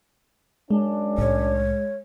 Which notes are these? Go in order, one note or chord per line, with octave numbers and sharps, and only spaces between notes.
F#2 G#3 C#4 D4
C2 A2 C#5